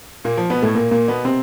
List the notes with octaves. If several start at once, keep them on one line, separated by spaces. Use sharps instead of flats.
A#2 A#3
F3
B2 B3
A2 A3
A#2 A#3
A#2 A#3
B2 B3
C3 C4